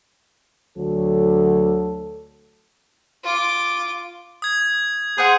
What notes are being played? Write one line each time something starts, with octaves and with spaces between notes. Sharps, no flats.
D2 F#3 A4
F4 D6
D#6 G#6
G#4 C5 F#5